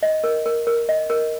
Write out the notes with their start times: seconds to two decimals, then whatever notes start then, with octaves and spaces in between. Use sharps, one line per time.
0.03 D#5
0.24 A#4
0.46 A#4
0.67 A#4
0.89 D#5
1.10 A#4